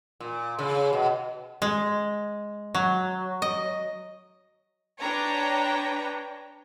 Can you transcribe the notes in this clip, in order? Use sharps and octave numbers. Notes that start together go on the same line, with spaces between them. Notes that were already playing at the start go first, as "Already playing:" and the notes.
A#2
C#3
B2
G#3
F#3
D#5
D4 B4 C#5 G5 A#5